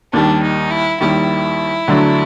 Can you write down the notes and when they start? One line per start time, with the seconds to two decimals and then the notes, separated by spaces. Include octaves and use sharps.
0.13 D#2 D#3 G3 D4
0.42 D#4
0.71 E4
1.00 D#2 D#3 G3 E4
1.88 D2 D3 F#3 A3 D4